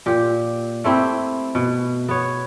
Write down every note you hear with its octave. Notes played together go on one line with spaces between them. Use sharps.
A#2 G4
A3 C4 E4 G4
B2
B3 C#5